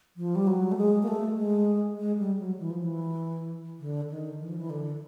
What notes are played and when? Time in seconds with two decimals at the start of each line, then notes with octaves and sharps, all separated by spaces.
0.17 F3
0.35 G3
0.47 F#3
0.72 A3
0.77 G#3
1.03 A#3
1.08 A3
1.38 G#3
1.98 G#3
2.18 G3
2.39 F#3
2.59 E3
2.71 F3
2.84 E3
3.80 D3
4.10 D#3
4.41 E3
4.49 F3
4.58 E3
4.70 D3